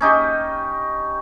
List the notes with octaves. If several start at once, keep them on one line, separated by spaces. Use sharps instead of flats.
C#4 D#4 G4